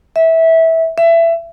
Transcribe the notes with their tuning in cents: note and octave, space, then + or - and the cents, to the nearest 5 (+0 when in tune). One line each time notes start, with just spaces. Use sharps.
E5 -15
E5 +20